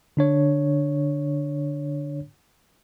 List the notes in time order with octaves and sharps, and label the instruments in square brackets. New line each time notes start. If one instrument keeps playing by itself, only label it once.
[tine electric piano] D3 D4 C#5